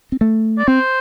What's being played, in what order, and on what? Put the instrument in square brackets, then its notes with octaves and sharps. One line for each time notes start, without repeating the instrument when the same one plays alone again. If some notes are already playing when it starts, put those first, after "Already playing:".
[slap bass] C4
A3
[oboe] D5
[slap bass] C4 [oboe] C5